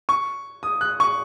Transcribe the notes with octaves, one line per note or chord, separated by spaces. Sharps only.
C#6
D#6
F#6
C#6